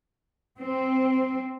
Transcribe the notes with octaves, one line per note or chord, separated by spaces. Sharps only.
C4